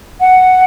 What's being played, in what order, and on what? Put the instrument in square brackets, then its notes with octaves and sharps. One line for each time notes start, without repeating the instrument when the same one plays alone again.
[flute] F#5